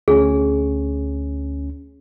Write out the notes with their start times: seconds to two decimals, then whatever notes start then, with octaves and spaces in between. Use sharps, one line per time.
0.08 D2 C#4 G#4